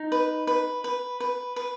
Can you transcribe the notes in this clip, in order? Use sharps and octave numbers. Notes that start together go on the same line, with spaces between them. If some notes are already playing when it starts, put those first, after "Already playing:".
Already playing: D#4
B4
B4
B4
B4
B4